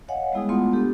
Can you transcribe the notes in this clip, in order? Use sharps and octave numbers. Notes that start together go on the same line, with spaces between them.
C#5 D#5 F5 F#5 G#5
G3 G#3 B3 E4 G#4 D#6
G#3 A3 B3 F4 F#5 C6
B3 D4 G4 A4